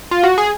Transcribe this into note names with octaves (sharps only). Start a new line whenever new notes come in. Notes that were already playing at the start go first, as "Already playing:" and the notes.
F4
F#4
G#4